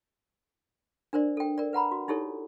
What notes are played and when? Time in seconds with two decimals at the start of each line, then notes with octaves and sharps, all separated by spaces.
1.13 D4 A#4 C5 D5
1.37 A4 G5
1.58 A#4 D5
1.73 B4 F#5 A#5 B5
1.91 F#4
2.08 D#4 E4 G4 A4 C#5